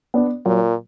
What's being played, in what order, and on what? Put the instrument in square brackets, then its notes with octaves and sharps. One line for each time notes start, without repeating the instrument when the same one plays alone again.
[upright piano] B3 D4
[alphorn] A#2 [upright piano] F#3